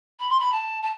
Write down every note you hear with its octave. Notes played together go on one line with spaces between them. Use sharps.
B5
C6
B5
A5
A5